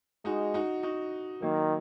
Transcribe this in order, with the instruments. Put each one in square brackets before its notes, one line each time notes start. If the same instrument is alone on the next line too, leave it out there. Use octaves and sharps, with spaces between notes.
[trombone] G#3 [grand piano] D#4 F#4
[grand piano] D#4 F#4
D#4 F#4
[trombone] D#3 [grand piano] F#3 A#3